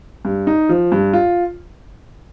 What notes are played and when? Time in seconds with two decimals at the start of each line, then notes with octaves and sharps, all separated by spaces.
0.25 G2
0.47 D#4
0.69 F3
0.92 G2
1.13 F4